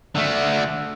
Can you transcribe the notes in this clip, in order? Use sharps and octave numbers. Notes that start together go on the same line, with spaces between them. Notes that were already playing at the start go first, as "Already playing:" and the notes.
D3 A3